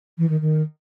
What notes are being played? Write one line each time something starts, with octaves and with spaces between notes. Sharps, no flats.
E3
D#3
D#3